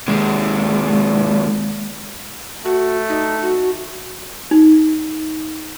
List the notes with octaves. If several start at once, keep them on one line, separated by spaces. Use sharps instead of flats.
D#2 G#3
A3 F#4
D#4
F#4
D#4